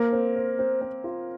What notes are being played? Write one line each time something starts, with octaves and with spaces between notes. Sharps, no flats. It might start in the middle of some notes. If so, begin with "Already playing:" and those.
Already playing: A#3 A#4 C5
C4
C5
C4
C4
F4